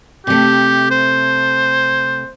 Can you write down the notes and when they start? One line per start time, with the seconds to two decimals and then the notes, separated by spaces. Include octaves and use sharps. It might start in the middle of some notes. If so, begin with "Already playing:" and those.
0.27 C3 A3 G4
0.91 C5